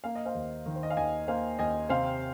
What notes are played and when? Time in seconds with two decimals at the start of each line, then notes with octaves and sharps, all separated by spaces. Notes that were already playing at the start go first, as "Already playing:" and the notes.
0.04 A#3 F5
0.15 D#5
0.25 C5 F5
0.35 D#2
0.66 D#3
0.76 C5
0.83 D#5
0.90 F5
0.97 D#2 D#5 G#5
1.28 A#3 C5 F5
1.59 D#2 D#5 G#5
1.89 C3 C5 F5